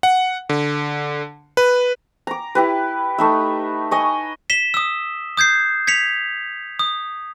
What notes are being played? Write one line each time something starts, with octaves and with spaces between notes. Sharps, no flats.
F#5
D3
B4
A#5 D6
E4 G4 B4
A3 D#4 E5
C#5 D#5 G#5
B6 E7 G7
D#6 E6
D#6 G6 G#6 C7
G#6 B6 C#7 F7
D#6